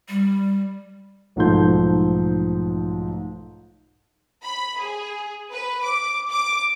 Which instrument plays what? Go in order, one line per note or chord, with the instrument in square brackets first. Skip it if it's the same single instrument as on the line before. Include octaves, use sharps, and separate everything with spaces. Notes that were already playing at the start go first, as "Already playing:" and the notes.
[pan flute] G3
[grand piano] B1 G#2 F3 A3 C6 G6
[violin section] B5
G#4
B4
D6
D6